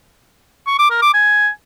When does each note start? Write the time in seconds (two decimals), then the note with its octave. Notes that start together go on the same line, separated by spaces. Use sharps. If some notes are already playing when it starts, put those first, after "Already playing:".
0.67 C#6
0.79 D6
0.90 A#4
1.02 D6
1.14 G#5